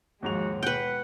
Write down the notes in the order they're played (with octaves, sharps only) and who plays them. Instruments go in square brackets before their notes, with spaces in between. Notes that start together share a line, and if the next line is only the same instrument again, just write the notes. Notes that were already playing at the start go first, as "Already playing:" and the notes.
[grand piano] D#2 G#2 F7 [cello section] F3 G#3 [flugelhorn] F#4
[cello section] B2 [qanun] B4 G5 [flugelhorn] F#5